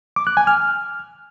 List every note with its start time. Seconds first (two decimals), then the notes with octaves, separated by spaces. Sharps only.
0.16 D6
0.27 F#6
0.37 G#5
0.47 F6